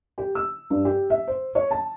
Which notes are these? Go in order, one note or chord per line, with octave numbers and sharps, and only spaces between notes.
G4
E6
G2
G4
E5
C5
C#5
A5